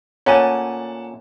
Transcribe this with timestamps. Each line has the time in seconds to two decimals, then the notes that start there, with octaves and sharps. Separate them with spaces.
0.26 A#2 A3 C#4 C#5 F#5 A5 D#7